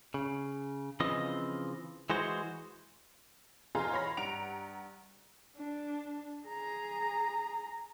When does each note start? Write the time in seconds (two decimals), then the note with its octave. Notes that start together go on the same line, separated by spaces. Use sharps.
0.14 C#3
1.00 C#3 E3 F3 C4 D#5
2.10 E3 G#3 F#4 C5
3.75 E2 B2 F4 G#4 A#5
3.93 C#5 B5 A#6
4.17 G2 F#5 A#5 D7 F7
5.57 D4
6.47 G#4 A#5